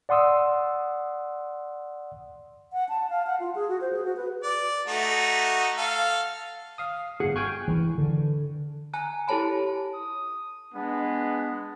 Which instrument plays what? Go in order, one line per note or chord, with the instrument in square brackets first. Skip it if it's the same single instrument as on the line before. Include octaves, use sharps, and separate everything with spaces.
[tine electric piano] D5 F#5 C6 D#6 E6
[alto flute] F#5
A5
F5
F#5
F4
G#4
F#4
C5
G#4
F#4
B4
[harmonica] D5
A3 D#4 F#4
A4 F5
[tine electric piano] F5 D#6
[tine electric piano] G1 F#5 [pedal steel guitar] G#4
[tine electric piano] G5 G#5 F#6 [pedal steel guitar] C#6 F6
[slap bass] E3
D3
[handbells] G#5 A#5 F#6
E4 G4 A4 C#5 A5 B5
[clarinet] D#6
[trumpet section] G#3 B3 [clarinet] D4